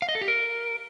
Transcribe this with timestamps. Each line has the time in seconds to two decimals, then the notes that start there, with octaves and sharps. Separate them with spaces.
0.02 F5
0.09 D#5
0.15 A4
0.21 G4
0.28 A#4